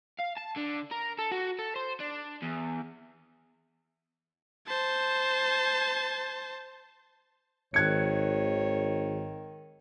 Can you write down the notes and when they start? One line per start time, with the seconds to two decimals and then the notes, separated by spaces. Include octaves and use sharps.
0.19 F5
0.37 A5
0.56 D3
0.91 A#4
1.19 A4
1.32 F#4
1.59 A4
1.76 C5
2.00 D4
2.42 E2
4.67 C5 A5
7.74 G#1 D#3 C#5 F#6 G#6 C#7